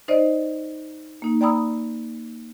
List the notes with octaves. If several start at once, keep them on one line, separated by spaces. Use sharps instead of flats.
D#4 C5 D5 D#5
A#3 D#4
D5 G5 A#5 B5 D#6 E6